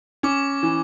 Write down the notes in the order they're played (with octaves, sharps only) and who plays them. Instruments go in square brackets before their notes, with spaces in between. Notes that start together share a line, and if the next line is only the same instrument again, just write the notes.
[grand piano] C#4 [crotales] D6
[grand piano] E3